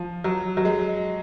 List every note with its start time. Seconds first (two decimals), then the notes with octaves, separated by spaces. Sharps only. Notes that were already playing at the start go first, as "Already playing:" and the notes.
Already playing: F3
0.24 F#3
0.57 F#3
0.65 G#3